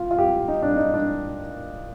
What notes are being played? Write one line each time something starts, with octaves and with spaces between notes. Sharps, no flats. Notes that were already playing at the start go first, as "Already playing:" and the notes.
Already playing: F4
F4
G4
D#4
D4
D#4
D4